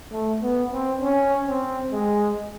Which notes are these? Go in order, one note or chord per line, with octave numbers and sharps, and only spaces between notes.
A3
B3
C4
C#4
C4
G#3